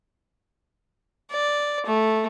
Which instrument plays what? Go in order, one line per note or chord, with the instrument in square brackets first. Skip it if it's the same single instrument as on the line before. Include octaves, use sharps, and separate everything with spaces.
[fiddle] D5
A3